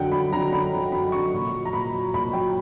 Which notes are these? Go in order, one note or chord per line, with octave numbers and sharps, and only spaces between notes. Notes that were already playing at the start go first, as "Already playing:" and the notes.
Already playing: F#2 D3 F#3 F#5 G5
F#2 B5
D3 F#3 A#5
F#2 B5
D3 F#3
F#2 B5
D3 F#3 C#6
A#2
F#3
A#5
A#2 B5
F#3
A#2 B5
F#3 G5